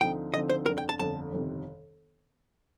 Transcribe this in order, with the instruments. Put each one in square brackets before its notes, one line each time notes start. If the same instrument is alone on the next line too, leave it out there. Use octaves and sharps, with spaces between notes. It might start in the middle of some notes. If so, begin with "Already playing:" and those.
[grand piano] D2 D3 F3 C4 D#4 [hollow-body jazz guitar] G5
[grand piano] D2 D3 F3 C4 D#4 [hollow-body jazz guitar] D#5
[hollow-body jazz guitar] C5
[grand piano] G1 F2 D3 [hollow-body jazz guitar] A#4
[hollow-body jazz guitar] G5
A5
[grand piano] G1 F2 D3 [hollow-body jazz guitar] A5
[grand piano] G1 F2 C3 D#3